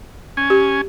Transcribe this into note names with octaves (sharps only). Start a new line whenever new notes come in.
C#4 G#5
G4